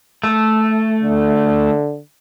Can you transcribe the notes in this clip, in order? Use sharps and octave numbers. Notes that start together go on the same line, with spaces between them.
A3
D3